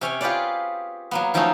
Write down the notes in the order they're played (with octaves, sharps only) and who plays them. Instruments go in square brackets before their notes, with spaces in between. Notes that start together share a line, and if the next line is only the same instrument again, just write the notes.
[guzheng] C3 C#4 C#5 G#5
F4 G4 G#4 B4 C#5 D5
F#3 A#3 B3
D#3 F3 F#3 A3 C#4 D#4